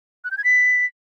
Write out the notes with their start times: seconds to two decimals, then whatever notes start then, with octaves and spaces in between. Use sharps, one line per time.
0.24 F#6
0.31 G6
0.38 G#6
0.44 B6